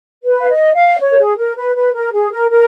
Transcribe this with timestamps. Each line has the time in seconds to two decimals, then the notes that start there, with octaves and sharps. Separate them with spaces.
0.23 B4
0.41 F5
0.50 D#5
0.74 F5
0.99 C#5
1.11 A#4
1.19 G#4
1.37 A#4
1.56 B4
1.75 B4
1.94 A#4
2.13 G#4
2.32 A#4
2.51 A#4